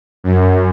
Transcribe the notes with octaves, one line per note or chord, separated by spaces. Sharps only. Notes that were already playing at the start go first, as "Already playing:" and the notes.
F#2